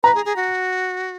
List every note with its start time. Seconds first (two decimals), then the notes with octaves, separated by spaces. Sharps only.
0.03 B4 A#5
0.15 G#4
0.25 G#4
0.36 F#4